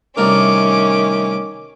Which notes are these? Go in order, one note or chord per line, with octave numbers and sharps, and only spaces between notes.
C2 D#3 A3 C#4 A#4 D6